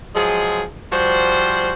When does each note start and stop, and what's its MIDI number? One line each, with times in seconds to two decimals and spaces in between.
0.15 0.62 53
0.15 0.62 54
0.15 0.62 56
0.15 0.62 68
0.92 1.73 53
0.92 1.73 55
0.92 1.73 66
0.92 1.73 72